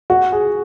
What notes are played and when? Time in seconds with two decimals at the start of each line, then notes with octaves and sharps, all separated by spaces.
0.10 F#4
0.32 G#4